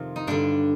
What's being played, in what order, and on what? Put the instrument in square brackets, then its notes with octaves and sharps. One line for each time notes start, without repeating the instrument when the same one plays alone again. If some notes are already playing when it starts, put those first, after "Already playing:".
Already playing: [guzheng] F2 C3 D#3 F4
D#4
G2 D3 D4